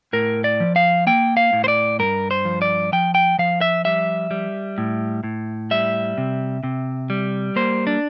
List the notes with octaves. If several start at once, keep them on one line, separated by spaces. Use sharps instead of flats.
A2 A#4
D5
F3
F5
A#3 G5
F5
A2
C5
D5
G2 A#4
C5
F3
D5
F3 G5
G5
F3 F5
E5
G3 E5
G3
A2
A2
G3 E5
C3
C3
G3
A#3 C5
D4